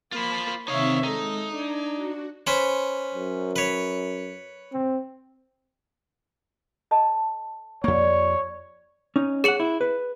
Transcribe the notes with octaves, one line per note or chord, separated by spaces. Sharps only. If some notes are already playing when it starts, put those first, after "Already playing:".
A#3 F4 C5 B5 C6
C3 D#3 C4 D#4 C#5 E5 F5
G#3 D#4 A4
D4 G#6
F#4
C#4 B4 C5
F#2
B4 C#5
C4
A4 D#5 A5
F2 G3 A#3 C#5
C#4 D#4
G#4 C#5 F#5 C#7 F#7
E4
B4